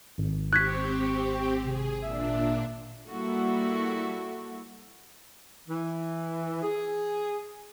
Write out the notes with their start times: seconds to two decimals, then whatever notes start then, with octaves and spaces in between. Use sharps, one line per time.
0.18 G#1
0.53 C4 G4 C#6 F#6 G#6 B6
1.64 C3 G#4
2.02 A#2 D4 E5
3.07 G3 A#3 E4 F#4 A4
5.69 E3
6.63 G#4